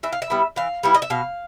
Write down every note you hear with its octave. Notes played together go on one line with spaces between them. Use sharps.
E3 E5
F5
E5
G3 B3 E4
E3 F5
G3 B3 E4
D#5
E5
B2 F5